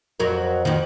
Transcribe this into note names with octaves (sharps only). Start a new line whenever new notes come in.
F2 F#3 A#4
F2 D#3